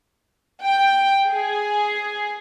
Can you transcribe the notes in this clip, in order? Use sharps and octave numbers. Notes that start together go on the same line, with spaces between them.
G5
G#4